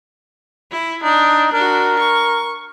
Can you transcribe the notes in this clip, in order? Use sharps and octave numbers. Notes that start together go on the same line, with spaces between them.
E4
D4 D#4
D4 F#4 A#4
C#6